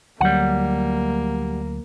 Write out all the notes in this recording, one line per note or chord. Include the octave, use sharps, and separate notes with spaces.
D2 F#3 G3 A#3 F#5